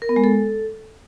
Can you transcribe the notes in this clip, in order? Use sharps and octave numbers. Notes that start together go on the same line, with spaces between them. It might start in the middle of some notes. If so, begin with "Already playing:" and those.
A#4
B3
G#3
A4